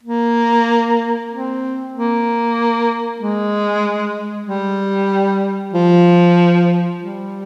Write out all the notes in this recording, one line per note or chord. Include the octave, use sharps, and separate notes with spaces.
A#3
C4
A#3
G#3
G3
F3
G3